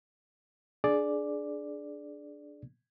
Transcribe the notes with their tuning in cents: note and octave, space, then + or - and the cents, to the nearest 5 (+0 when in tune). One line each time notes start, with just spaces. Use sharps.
D4 +0 G#4 +20 D5 +0